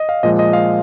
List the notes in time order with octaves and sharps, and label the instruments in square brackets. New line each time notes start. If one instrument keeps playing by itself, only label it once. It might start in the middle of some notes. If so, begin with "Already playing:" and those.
Already playing: [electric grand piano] D#5
F5
A#2 F3 G#3 D#5
D#5
F5